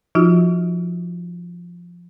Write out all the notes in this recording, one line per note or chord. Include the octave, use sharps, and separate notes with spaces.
F3 D#4 F4 F#4